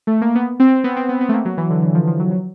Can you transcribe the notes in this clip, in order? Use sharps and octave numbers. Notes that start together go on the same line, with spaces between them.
A3
A#3
B3
C4
B3
C4
B3
B3
A3
A#3
F#3
E3
D3
D3
F3
F3
F#3
F#3